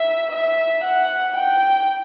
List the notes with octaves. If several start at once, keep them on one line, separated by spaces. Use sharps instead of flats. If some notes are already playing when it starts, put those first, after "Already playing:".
Already playing: E5
E5
F#5
G5